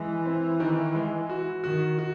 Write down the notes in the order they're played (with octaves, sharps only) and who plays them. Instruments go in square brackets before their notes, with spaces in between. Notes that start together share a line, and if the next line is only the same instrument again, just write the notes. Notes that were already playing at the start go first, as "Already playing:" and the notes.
Already playing: [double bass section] E3 [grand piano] G#3
[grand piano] C4
D#3
G#3
F#4
[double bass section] D#3 [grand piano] F#4
[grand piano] F#4